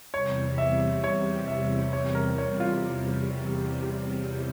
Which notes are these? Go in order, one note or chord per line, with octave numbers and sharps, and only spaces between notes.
E2 C3 G3 C#5
E5
C#5
E5
C#5
A#4
C#5
F4